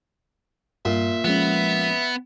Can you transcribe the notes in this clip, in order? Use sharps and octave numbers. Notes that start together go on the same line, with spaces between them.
G2 A#2 E5
F3 G#3 B3 C#4